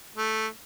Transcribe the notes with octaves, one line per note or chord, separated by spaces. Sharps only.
A3